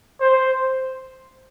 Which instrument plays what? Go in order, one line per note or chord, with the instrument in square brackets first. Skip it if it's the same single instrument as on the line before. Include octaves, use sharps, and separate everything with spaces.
[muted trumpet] C5